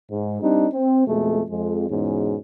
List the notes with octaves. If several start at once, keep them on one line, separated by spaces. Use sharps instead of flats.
G#2
G3 C4 D4 D#4
C4
F2 B2 G#3 A3
F2 G#3
E2 G#2 B2 C#4